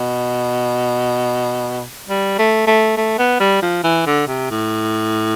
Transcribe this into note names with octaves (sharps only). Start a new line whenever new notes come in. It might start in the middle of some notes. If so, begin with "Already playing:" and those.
Already playing: B2
G3
A3
A3
A3
B3
G3
F3
E3
D3
C3
A2